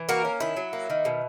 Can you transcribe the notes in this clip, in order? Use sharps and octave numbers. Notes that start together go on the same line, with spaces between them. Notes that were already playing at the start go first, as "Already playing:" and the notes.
Already playing: E3
A#3 F#4 A#4
C#4
D#3 E4
F#3
A#3
D#3
B2